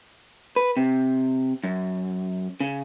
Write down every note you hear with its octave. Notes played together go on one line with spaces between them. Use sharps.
B4
C3
F#2
C#3